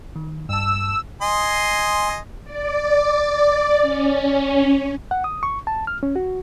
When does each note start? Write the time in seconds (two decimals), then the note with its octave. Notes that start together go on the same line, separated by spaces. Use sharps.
0.16 D#3
0.49 G2 A5 E6
1.22 D#5 G#5 C6
2.44 D5
3.81 C#4
5.11 F#5
5.24 D#6
5.43 C#6
5.67 A5
5.87 F6
6.03 C#4
6.16 F#4